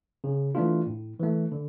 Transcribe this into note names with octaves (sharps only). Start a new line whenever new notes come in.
C#3
E3 A3 D4 F4
A2
E3 A3
D3